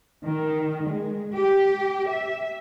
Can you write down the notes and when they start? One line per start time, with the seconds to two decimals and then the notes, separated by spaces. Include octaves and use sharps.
0.23 D#3
0.88 G#3
1.34 G4
2.09 E5